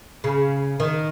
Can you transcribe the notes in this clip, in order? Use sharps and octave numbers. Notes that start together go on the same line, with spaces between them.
C#3
D#3